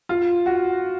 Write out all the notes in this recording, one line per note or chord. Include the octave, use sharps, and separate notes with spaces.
F4
F#4